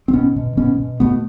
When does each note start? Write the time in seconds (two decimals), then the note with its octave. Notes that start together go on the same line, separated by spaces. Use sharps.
0.08 C4
0.13 B2 B3 C#4
0.36 B2
0.57 B2 B3 C#4
0.78 B2
1.00 B2 A3 B3